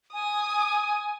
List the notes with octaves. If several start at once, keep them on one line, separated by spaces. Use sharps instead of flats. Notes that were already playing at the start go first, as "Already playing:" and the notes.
G#5 D#6